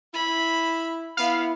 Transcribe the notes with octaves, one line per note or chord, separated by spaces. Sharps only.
E4 B5
B3 E4 F5